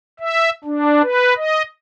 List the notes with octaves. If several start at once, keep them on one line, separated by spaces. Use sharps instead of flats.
E5
D4
B4
D#5